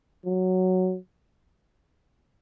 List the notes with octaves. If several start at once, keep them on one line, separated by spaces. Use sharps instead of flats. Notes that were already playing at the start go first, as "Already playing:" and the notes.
F#3